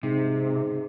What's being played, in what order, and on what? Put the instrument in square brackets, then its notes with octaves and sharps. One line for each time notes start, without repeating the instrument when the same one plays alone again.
[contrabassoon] G#2 [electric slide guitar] C3